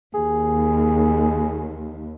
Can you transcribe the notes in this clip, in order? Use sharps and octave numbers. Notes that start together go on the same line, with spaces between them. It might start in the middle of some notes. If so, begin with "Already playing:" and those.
D#2 G#4